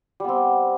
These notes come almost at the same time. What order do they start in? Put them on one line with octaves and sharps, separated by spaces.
G3 B3 C4